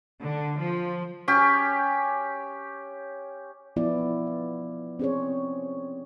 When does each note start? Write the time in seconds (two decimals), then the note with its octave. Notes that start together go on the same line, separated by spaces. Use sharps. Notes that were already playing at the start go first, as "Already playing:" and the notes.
0.23 D3
0.59 F3
1.28 C#4 G4
3.76 F3 B3 E4 D5
4.27 F5
4.99 C4 C#4 G#4 C5 C#5